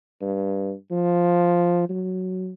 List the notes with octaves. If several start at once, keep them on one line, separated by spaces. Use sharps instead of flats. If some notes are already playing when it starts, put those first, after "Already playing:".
G2
F3
F#3